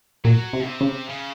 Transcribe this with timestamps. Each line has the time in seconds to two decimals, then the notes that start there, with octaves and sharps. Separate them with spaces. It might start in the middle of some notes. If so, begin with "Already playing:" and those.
0.25 A#2 F#3
0.53 C3
0.67 C3
0.81 C#3
1.09 C#3